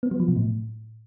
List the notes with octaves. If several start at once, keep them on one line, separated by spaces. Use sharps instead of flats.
B3
F#3
F3
B2
A2